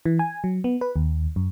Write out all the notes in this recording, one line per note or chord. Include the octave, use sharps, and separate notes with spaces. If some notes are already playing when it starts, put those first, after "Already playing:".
E3
G#5
F#3
B3
B4
D#2
F#2